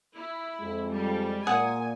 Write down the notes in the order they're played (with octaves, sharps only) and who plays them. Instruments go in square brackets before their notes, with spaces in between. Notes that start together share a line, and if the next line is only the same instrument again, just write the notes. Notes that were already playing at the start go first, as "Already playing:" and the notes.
[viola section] E4
[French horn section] F2 [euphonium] G#3
[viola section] G3
[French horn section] A#2 [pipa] G#4 F#5 [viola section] G#5